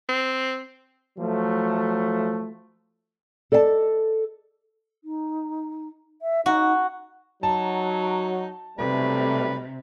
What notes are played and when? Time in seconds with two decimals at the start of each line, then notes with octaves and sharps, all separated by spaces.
0.09 C4
1.17 F3 F#3 A3
3.52 A4 D5 D#5 F5 A5
5.04 D#4
6.22 E5
6.46 D#4 F#4
7.43 F#3 D#4 A5
8.78 B1 C3 G3 A3 B4